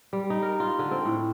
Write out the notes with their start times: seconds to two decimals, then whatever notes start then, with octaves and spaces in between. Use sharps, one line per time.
0.13 G3
0.30 D#4
0.43 A#4
0.60 F4
0.79 D3
0.91 C4
1.05 A2